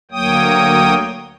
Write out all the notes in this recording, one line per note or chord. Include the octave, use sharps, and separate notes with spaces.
D2 F#3 A#3 C#5 G5 D#6